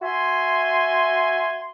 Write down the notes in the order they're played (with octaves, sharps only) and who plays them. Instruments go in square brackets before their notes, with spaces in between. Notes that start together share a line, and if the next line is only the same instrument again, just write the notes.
[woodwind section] F#4 E5 G#5 C6